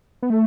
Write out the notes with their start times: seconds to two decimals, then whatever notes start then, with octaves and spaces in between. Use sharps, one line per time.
0.23 B3
0.30 A3